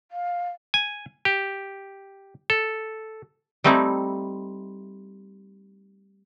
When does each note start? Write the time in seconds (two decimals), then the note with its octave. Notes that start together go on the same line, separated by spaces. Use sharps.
0.11 F5
0.74 G#5
1.25 G4
2.50 A4
3.64 G3 A3 C4 D#4 E4